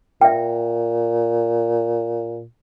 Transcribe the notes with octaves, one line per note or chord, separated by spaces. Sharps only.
A#2 E5 G5